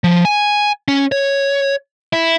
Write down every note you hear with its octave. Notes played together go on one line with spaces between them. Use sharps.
F3
G#5
C#4
C#5
E4